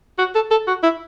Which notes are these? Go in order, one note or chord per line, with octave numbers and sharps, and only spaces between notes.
F#4
A4
A4
F#4
E4